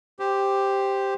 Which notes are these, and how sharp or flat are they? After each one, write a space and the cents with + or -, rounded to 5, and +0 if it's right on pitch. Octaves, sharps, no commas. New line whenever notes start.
G4 +5 C5 +0